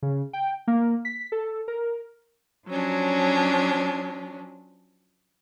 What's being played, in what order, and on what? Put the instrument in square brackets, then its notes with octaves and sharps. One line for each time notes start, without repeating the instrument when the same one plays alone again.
[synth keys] C#3
G5
A#3
B6
A4
A#4
[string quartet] F3 F#3 C#4 D4